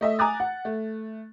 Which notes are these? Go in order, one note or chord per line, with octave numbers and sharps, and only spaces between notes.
A3 D#5 E5
G#5 A#5 D6 D#6 F#6 A6
F#5
A3